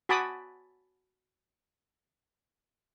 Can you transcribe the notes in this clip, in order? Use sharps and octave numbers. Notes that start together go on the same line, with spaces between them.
F#4 G#5 A5 B5 D6 D#6